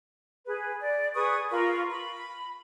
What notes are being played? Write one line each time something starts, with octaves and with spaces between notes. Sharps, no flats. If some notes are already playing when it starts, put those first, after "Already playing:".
G#4 B4
D5
G#4 B4 C#6 D#6
F4 A#4 B5 C#6
B5